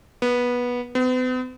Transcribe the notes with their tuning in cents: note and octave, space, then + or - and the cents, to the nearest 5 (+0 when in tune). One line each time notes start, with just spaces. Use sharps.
B3 -15
B3 +45